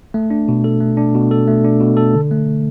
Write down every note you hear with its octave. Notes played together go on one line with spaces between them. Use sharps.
A3
D4
B2
A4
A3
D4
B2
A4
A3
D4
B2
A4
D3
A3